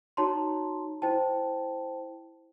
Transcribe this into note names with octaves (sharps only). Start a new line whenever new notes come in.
D#4 F#4 C#5 A5 A#5 C6
E4 C5 G5 A5